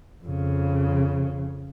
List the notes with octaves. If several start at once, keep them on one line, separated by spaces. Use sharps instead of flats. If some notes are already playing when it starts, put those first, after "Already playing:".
F2 C#3